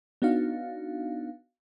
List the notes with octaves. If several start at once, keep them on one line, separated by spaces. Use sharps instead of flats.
B3 D4 D#4 F#4 F5